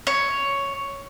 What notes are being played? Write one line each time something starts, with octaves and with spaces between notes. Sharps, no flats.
C#5